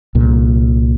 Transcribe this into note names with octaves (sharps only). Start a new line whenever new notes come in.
C2 A#2